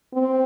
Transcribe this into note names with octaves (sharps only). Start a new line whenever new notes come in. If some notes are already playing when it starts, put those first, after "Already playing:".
C4